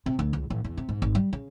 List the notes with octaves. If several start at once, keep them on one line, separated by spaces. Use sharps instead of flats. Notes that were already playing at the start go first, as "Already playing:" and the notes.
C3
D2
C#2
A1
E2
C3
G#2
G#1
G3
C#3